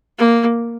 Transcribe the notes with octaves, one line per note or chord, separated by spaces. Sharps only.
A#3